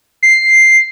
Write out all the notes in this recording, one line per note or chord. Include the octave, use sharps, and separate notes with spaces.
C7